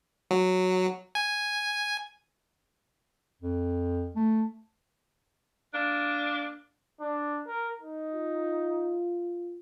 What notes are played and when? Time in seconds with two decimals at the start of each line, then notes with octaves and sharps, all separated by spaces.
0.31 F#3
1.15 G#5
3.42 F2
4.16 A3
5.72 A#3 D4
7.00 D4
7.47 A#4
7.79 D#4
8.13 F4